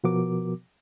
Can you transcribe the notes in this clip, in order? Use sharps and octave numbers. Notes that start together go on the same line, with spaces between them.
B2 F3 B3 F#4 A#4 D6